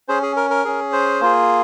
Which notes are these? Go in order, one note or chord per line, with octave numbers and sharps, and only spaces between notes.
C#4 G#4 C5
G#4
A#4
A#4
C#4 G#4
C5
A#3 F4 G#4